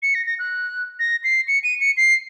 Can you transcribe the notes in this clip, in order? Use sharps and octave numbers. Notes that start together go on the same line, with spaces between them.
C#7
A#6
A#6
F#6
A#6
C7
C#7
D#7
C#7
C7